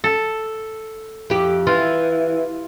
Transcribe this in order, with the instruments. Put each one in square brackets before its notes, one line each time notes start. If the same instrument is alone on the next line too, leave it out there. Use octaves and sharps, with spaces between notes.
[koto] A4
[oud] F2 G4
[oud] E3 [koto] F4